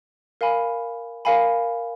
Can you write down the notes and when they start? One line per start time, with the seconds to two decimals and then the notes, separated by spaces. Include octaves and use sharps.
0.41 A#4 F5 G#5 B5
1.25 A#4 F5 G#5 B5